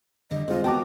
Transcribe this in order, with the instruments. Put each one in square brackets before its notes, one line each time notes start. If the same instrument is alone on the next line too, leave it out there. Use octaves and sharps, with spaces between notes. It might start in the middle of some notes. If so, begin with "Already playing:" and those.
[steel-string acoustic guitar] D3 G3 [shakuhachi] D#5
[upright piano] G#3 F4 [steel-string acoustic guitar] C4 [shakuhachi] D#5
[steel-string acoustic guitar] B3 A#4 [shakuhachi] F#4 [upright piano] G5 A5 D6